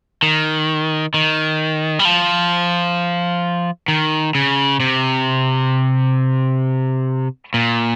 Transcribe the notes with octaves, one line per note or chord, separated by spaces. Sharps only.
D#3
D#3
G3
F3
D#3
C#3
C3
A#2